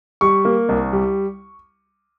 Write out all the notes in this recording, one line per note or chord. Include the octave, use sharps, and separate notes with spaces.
G3 C#6
A#3
C2
G3